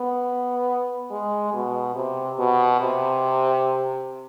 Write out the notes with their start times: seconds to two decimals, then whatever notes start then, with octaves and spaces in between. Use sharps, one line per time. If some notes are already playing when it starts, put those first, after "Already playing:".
Already playing: B3
1.11 G#3
1.53 B2
1.95 C3
2.38 B2
2.80 C3